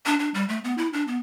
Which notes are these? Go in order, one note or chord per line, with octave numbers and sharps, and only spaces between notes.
D4
D4
G3
A3
B3
E4
D4
B3